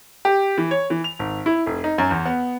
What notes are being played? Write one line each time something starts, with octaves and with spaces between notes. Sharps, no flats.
G4
E3
C#5
E3
F7
G#1
E4
F1
D#4
F#2
E2
B3